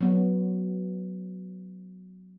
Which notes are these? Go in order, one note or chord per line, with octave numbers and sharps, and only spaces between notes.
F#3 B3